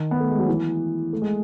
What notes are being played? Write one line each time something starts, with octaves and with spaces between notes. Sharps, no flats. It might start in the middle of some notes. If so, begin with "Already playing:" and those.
Already playing: D#3
B3
A3
G#3
F#3
E3
A3
G#3